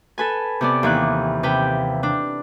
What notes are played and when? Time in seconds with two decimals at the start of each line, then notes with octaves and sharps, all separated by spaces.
0.18 A4 B4 G#5
0.61 C3 B3 D5
0.83 D#2 E3 F#6
1.43 C3 B4 G5
2.03 D4